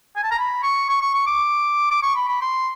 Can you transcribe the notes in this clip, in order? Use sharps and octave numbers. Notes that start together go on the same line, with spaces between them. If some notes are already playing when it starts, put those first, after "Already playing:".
G#5
A5
A#5
B5
C#6
C#6
C#6
C#6
D6
D6
C#6
B5
B5
C6